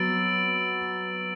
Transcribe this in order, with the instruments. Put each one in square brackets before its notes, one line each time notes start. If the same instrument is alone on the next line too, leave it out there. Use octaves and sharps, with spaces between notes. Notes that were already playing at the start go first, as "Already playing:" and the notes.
Already playing: [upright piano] F#3 B3 [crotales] E6 A6 D7 F#7